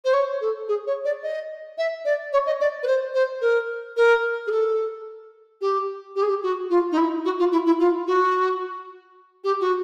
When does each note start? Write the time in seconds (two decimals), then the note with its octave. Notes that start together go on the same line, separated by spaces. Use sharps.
0.04 C5
0.13 C#5
0.41 A4
0.68 G#4
0.87 C#5
1.05 D5
1.23 D#5
1.78 E5
2.05 D5
2.33 C#5
2.46 D#5
2.60 D5
2.83 B4
2.87 C5
3.14 C5
3.41 A#4
3.97 A#4
4.47 G#4
4.51 A4
5.61 G4
6.16 G4
6.22 G#4
6.29 G4
6.42 F#4
6.70 F4
6.92 D#4
6.98 E4
7.25 F#4
7.39 F4
7.52 E4
7.66 E4
7.80 F4
8.07 F#4
9.44 G4
9.60 F#4